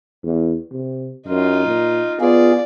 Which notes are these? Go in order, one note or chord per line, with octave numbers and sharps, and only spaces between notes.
E2
C3
F#2 D#4 F4
A#2
B3 F4 G#4 D5